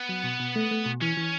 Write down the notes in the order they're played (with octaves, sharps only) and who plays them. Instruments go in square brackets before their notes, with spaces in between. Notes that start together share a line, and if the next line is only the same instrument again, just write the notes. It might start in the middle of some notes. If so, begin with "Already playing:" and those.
Already playing: [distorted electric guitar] B3
[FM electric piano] F#3
B2
B2
A3
A3
B2
[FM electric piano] E3 [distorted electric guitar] C#4
[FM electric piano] E3